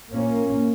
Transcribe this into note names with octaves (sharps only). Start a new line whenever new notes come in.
A#2 A#3 C#4